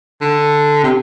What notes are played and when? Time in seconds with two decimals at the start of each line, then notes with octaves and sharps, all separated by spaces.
0.21 D3
0.83 C3